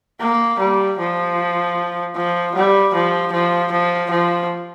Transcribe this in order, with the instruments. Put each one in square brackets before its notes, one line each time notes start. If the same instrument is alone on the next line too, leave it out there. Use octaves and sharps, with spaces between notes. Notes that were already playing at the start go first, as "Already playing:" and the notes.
[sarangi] A#3
G3
F3
F3
G3
F3
F3
F3
F3